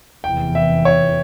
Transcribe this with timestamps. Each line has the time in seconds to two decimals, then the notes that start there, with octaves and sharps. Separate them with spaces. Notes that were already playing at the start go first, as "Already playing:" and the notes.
0.24 F1 E2 E3 G5
0.55 E5
0.85 C#5